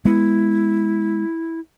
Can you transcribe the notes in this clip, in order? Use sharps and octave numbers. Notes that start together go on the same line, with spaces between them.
G#3 B3 E4